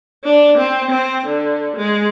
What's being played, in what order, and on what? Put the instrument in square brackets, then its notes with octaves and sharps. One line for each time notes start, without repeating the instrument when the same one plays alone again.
[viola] D4
C4
C4
D3
G#3